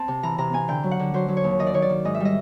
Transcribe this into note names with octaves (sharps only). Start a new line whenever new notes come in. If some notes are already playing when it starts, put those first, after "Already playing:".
Already playing: C4 A5
C3
E3 A#5
C3 A#5
C4 G#5
D3 G5
F#3
F#5
D3
F#3 C5
F#3
C#5
D#2
D#3 D#5
D5
D#3 C#5
D5
D#3
G#2 D#5
E5
G3 D#5